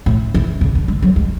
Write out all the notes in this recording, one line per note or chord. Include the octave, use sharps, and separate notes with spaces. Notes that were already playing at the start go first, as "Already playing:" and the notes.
A2
E3
C#3
D3
G#3
F#3
G#3